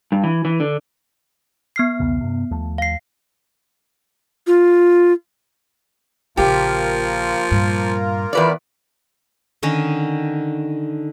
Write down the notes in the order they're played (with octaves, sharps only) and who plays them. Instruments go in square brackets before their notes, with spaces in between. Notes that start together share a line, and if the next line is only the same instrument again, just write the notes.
[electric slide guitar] G2
E3
E3
D3
[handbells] B3 F6 C7
[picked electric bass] B1 E2 C#3
G2 C3
D#2 F3 A3
[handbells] F5 C7
[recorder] F4
[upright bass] A#1 C#3 [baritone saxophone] F3 [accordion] A#3 F4 A#4 [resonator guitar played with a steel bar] G4
[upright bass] G2 A#2
[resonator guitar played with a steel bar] E2 B4 D5 [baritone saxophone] A#2
[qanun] D3 D#3 C#4 D#4